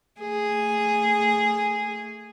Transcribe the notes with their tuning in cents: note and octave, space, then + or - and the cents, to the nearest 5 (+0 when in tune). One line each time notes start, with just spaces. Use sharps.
A3 +25 G#4 -5